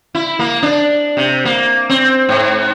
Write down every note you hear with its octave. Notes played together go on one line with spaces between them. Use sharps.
E4
A#3
D4
C3
A#3
C4
G#2